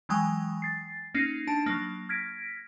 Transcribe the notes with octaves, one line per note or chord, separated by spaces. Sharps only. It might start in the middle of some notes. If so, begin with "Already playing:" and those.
E3 F#3 G#3 G5 G#5 D#6
A6 C7
A#3 C#4 D#4 A#6 C7
D4 A5
F#3 A#3
F6 G#6 A#6 B6 D7